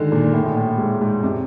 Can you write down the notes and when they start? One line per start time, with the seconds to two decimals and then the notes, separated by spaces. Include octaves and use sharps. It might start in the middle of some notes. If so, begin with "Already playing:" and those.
Already playing: D3 D#3 G#3
0.12 A#2
0.34 A2
0.46 A#2
0.56 A2
0.78 G#2
1.01 G#2
1.23 C3